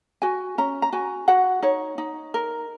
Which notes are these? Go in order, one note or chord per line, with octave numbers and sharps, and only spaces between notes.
F#4 G#5
C#4 A#5
A#5
F#4 G#5
F#4 F#5
D#4 C#5
D#4
A#4